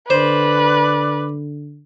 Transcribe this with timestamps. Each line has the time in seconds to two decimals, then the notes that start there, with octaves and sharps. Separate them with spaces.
0.10 D3 B4 C5 D5